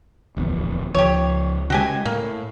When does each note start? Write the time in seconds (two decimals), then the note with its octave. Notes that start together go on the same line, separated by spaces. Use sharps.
0.37 D1 A#1 E2
0.94 C#2 F3 G4 C#5
1.70 C#3 G#3 F#4 G4 G#5
2.05 A2 A#3